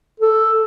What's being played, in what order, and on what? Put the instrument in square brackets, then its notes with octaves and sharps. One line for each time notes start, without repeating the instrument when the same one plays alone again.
[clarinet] A4